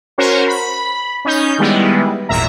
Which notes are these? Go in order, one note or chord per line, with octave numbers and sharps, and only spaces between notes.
C#4 F#4 A#4 C5 C#5
B5
C#4 D#4 G6
D#3 G3 G#3 B3 E4
G#1 E2 A#2 E5 A#5